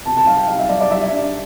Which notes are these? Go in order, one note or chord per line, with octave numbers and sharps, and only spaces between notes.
C3 A5
A5
G3 F5
G5
G3 F5
E5
G3 D5
D5
G3 E5
D4